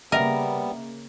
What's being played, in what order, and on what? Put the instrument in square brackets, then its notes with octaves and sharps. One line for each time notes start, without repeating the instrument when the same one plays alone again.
[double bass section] C#3 A#3 [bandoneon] G3 B3 [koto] A#4 [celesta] D#5 E5